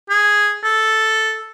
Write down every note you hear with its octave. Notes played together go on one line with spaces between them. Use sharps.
G#4
A4